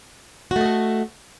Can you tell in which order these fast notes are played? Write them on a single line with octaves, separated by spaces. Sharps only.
F#4 A3 D#5 A4